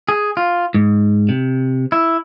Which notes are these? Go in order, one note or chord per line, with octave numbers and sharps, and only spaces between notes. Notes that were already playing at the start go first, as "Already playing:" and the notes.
G#4
F4
G#2
C3
E4